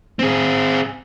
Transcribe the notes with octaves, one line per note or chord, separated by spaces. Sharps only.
C4 G#4